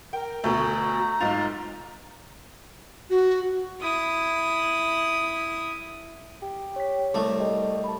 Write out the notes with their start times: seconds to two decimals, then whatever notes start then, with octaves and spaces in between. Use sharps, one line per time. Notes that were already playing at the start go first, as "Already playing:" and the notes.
0.13 A#4 G5
0.44 D2 B2 A3 A#5
1.20 B1 G#2 F4 F7
3.10 F#4
3.81 E4 D#6
6.42 G4
6.76 C#5 B6
7.15 C2 A3
7.40 G3 A4 D#5
7.84 A5 B5